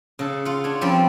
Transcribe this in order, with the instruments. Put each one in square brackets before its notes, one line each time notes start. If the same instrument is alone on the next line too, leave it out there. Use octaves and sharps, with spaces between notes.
[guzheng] C#3 A4
F4 F#5
D4 C#5
G2 F3 C4 C#4 D5 B5